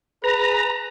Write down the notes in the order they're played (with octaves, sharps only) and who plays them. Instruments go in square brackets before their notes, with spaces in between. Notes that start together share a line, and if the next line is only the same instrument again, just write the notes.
[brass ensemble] G#4 B4 [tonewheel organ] A#5